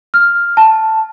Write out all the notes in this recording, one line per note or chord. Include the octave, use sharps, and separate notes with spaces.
F6
A5